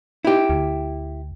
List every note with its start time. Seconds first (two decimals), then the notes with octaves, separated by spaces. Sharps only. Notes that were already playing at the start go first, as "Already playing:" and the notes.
0.25 D#4 E4 G4
0.50 D2